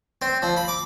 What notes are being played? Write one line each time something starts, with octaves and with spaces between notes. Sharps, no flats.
C4
F3
B5
D6